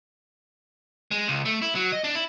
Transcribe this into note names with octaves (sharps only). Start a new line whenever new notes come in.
G#3
C#2
A3
E4
F#3
D#5
D4
E4